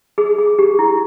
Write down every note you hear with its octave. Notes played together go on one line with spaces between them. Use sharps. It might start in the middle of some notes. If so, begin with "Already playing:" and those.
G#4
G#4
G4
E4